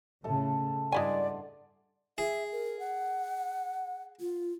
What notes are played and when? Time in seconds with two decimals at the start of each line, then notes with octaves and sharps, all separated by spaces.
0.24 A2 C#3 A4 E5 A5
0.92 G2 G#3 E4 D5 F#5 G#5 C6
2.18 G#4 E5
2.52 A#4
2.79 F#5
4.20 F4